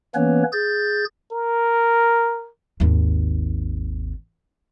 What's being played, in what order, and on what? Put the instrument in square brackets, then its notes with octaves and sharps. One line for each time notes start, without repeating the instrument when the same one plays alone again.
[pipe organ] E3 A#3 B3 C#4 B4 C#5
G#4 G6 A6
[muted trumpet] A#4
[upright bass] G#1 D#2